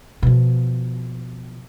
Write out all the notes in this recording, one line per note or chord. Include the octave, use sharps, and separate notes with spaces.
B2 F3